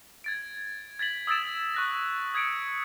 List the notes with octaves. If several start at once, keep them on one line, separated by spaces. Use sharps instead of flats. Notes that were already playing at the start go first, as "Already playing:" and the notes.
G#6 A6 D7
G#6 A6 B6 F#7
D#6 E6 G#6 A6 D7 E7
C#6 F#6 A#6
D#6 G#6 B6 C#7 D7